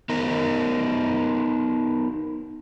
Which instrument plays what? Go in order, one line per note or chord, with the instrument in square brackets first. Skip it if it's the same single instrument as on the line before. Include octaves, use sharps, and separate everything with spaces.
[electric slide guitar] B3 D#4 A#4